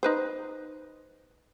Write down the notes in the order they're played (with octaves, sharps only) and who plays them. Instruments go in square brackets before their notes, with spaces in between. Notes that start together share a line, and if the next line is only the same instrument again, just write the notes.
[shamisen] D#4 B4 C5